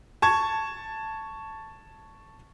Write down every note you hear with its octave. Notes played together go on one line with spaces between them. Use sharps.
A5 C#6 G#6